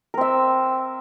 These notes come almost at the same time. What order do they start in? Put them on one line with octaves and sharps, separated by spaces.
A#4 C4 E5